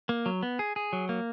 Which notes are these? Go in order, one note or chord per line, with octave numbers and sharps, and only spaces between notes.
A#3
F#3
B3
G#4
G#4
F#3
A#3